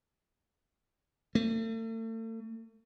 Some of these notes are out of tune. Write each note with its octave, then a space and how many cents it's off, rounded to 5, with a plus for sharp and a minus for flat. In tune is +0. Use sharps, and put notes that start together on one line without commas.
A3 +40